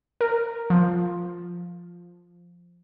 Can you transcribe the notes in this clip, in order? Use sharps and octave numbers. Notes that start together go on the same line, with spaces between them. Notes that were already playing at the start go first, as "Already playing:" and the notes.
A#4
F3